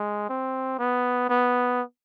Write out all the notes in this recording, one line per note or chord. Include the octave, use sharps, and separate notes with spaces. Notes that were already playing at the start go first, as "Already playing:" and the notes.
Already playing: G#3
C4
B3
B3